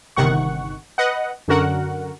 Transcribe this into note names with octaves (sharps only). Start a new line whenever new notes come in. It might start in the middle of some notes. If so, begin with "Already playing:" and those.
G1 C3 D#3 F#5 C#6
B4 D#5 F#5
F#2 D3 F#4 A#4 F#5